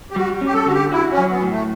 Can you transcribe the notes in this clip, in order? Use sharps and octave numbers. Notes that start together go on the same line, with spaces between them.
G4
G3 F#4
C#4
G4
A4
D3 F#4
G4
E4 F#4
C#4
F#3
B3
A2
A3